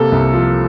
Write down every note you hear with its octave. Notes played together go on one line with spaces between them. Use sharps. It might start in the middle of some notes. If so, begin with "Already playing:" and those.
Already playing: C3 A#3 A4
C2
F3